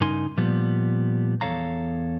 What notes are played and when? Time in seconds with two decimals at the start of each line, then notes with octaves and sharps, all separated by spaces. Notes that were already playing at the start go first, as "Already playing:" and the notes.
0.01 G2 C#3 D#4 A#4 G#5 C6
0.37 A#2 F3 G3 B3
1.41 E2 C3 A4 C#5 F5 A#5